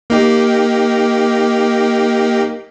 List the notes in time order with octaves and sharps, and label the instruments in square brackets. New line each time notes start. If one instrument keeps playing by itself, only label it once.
[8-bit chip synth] A#3 D#4 G4